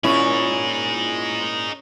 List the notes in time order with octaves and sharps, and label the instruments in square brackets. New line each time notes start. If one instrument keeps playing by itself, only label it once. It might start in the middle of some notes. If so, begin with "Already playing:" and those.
[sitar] A#2 E4 [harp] C#4 [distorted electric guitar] D#4 G#4